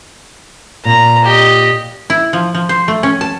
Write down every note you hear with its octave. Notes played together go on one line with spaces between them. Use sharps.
A#2 A#5
G4 D#5
E4
F3
F3
C5
A3
C#4
A5